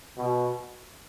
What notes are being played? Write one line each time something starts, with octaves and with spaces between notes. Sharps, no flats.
B2